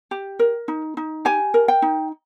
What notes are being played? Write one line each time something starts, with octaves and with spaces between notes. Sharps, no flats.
G4
A#4
D#4
D#4
G4 G#5
A#4
G5
D#4